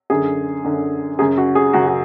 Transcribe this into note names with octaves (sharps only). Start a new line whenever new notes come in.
F#2 D3 G#4
F#2 D3
F#2 C#3 G#4
F#4
G#4
F#2 C#3 F#4
F#4